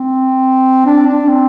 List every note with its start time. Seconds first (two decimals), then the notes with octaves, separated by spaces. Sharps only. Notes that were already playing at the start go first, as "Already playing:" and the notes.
Already playing: C4
0.86 D4
1.07 D4
1.28 C4